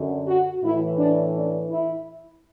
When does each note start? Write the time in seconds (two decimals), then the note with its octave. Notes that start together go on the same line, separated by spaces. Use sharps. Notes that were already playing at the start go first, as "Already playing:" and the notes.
Already playing: F#2 D3
0.28 F#4
0.63 A2 E3 E4
0.98 D4
1.34 D4
1.69 E4